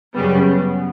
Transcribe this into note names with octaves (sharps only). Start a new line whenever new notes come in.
F#2 C#3 G3 B3